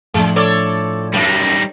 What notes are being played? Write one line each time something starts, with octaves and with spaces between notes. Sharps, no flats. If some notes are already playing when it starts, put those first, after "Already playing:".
A2 F3 G#3 D4
A4 C#5 D5
F#2 G3 D#4